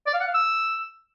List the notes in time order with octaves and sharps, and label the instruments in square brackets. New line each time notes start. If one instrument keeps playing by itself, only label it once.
[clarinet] D5
F5
F#5
F5
E6